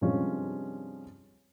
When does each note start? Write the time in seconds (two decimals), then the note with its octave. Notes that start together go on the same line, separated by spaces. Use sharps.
0.01 G2 C3 F3 G#3 C#4 F4